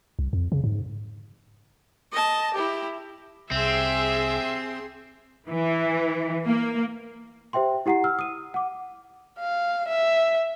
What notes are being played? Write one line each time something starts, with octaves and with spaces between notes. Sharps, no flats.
C2
F2
C#3
G#2
D#5 A5
E4 G4
C2 C4 G4 G#4 E5 C6
E3
A#3
G4 C5 E5 G5 C6
E4 G4 F#5 A#5 C7
E6 F6
D#6 D#7
F#5 D6
F5
E5